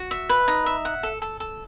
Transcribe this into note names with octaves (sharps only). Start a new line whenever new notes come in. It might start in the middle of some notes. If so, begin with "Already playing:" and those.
Already playing: F#4
E5
B4
D#4
E5
F#5
A4
A4
A4